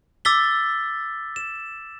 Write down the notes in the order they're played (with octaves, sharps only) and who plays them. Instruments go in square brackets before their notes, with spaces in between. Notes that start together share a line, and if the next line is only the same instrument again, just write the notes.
[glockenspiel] D6 E6 A6 B6 G7
E7